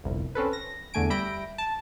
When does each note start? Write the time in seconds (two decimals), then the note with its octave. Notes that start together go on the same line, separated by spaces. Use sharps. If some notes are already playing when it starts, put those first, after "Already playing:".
0.04 G1 C2 F2
0.35 C4 C#4 A4 B4
0.53 A#6
0.94 E2 D3 A3 G#5 D7
1.10 G3 E5 B5 G6 A#6 D7
1.58 A5